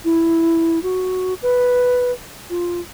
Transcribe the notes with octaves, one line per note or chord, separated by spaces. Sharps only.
E4
F#4
B4
F4